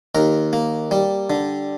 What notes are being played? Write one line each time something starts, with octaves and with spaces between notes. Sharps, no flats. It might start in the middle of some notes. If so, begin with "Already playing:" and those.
D#2 A#4
A#3
G3
D3